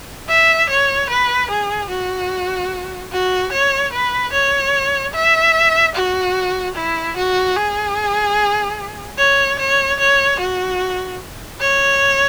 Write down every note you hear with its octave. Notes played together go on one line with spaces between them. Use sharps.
E5
C#5
B4
G#4
F#4
F#4
C#5
B4
C#5
E5
F#4
E4
F#4
G#4
C#5
C#5
C#5
F#4
C#5